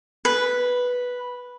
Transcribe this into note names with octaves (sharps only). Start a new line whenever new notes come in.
B4